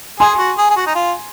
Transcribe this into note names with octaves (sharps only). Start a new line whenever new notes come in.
G#4 G#5 C6
F#4
G#4
G#4
F#4
D#4
F4